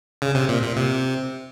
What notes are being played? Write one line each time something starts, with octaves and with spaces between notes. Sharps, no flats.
C#3
C3
A#2
A#2
C3